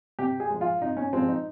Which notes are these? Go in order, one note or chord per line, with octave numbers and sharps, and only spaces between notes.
C3 G4
G#4
F3 G#3
F4
C3 D#4
C#4
F3 G#3 C4
D#4